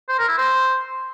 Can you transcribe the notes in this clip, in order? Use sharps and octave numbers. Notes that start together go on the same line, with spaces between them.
C5
A#4
E4
C5